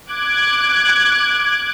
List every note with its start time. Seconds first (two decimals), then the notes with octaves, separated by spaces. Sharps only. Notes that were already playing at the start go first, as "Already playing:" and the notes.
0.11 D6 F#6 G#6